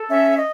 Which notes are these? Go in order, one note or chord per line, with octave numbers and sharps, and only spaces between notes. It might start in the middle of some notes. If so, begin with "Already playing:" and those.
Already playing: A4
C#4 E5
D#5